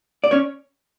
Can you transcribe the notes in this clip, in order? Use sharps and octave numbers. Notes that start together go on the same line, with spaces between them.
D5
C#4 C#5